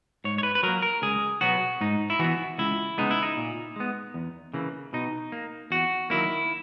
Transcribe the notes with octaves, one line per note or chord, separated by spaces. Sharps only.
G#2 C#5
C#5
B4
B4
F#3 A#3 A#4
A#4
C#2 G#4
B2 F#3 B3 F#4
G#2 D#4
E4
E3 B3 F#4
C#2 E4
C#3 G#3 B3 D#4
E4
D#4
A#2
G#3 B3
E2
C#3 E3 A#3
B2 D#4
A#3
E2 F#4
D#3 F#3 A#3 E4